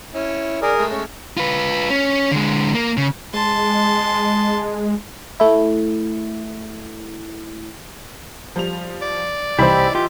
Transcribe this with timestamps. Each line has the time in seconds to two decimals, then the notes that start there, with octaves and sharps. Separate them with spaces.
0.15 C#4 E4
0.62 D#3 G#4 A#4 D5
0.78 G#3 A3
0.91 C#4 C#5
1.37 F4 B4
1.90 C#4
2.31 D3 G#3
2.75 A#3
2.97 C#3
3.34 G#3 A5 C6
5.40 A3 E4
8.56 F3 G3 F7
9.02 D5
9.59 C2 E3 D#4 E4 G4 C5 B5
9.95 F4 G4